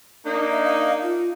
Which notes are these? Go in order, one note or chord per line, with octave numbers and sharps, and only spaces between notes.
A#3 D4 D#4
E5
F5
F4